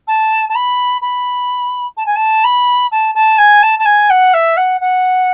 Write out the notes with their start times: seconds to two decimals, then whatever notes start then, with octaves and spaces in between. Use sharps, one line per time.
0.08 A5
0.49 A5
0.55 B5
1.01 B5
1.97 A5
2.06 G#5
2.16 A5
2.44 B5
2.91 A5
3.15 A5
3.38 G#5
3.63 A5
3.79 A5
3.85 G#5
4.10 F#5
4.34 E5
4.57 F#5
4.81 F#5